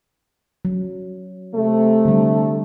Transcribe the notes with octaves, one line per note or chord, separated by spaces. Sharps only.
F#3
C3 A3
D3 G3